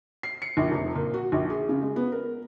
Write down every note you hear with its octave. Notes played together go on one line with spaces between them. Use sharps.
C7
C#7
A#1
F1
A#2
F#4
A#1
G#4
C#3
G#3
B3
A#4